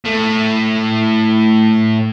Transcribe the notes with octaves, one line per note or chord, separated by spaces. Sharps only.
A2 A3